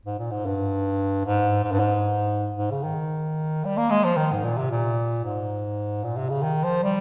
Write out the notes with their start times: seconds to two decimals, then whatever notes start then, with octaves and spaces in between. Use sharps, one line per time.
0.06 G#2
0.19 A#2
0.31 G#2
0.46 G2
1.25 G#2
1.64 G#2
1.72 G2
1.80 G#2
2.57 G#2
2.71 C#3
2.84 D#3
3.65 G3
3.77 A#3
3.90 G#3
4.04 F3
4.17 D#3
4.33 G#2
4.44 A#2
4.58 C3
4.71 A#2
5.24 G#2
6.04 A#2
6.17 C3
6.30 C#3
6.43 D#3
6.64 F3
6.84 G3